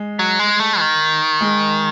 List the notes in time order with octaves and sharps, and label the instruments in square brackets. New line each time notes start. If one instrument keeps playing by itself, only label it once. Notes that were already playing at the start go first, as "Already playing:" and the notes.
Already playing: [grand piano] G#3
[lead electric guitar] F#3
G#3
A3
D#3
[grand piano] G#3